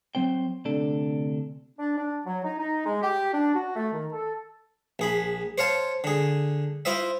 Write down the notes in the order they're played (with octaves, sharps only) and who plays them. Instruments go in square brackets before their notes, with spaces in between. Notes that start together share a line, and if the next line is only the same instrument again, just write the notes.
[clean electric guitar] F#3 C4 C5 G5
D2 C3 D4 A4
[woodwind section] D4
D4
F#3
D#4
D#4
G#3
G4
D4
F#4
A3
D#3
A4
[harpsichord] A#1 G#4 B5
C5 C#5 F5 A5
D3 G#4
E4 F4 C5 D#5 E5